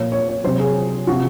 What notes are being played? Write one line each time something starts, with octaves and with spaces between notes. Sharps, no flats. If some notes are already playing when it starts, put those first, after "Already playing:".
Already playing: A#2 F3 C#5
C#5
C#5
C3 F#3 C5
G#4
C3 F3 F#4